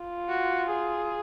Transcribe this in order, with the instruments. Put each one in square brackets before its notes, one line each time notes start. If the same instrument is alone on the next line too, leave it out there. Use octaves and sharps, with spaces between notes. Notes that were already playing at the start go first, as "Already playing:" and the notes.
Already playing: [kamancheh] F4
[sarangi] F#4
G#4